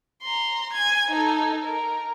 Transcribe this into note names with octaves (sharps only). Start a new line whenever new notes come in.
A#5 C6
G#5 G#6
D#4 A4
A#4